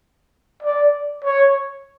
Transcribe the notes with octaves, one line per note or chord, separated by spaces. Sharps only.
D5
C#5